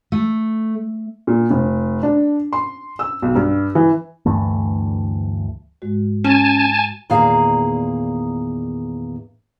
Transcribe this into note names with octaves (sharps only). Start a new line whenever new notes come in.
A3
A#2
F1
D4
C6
E6
B1
G2
E3
D2 G2 E3 A3
G#2 G#3 F#4
C#4 G#5 A5
E2 A#2 D#3 G#4 F5 A#5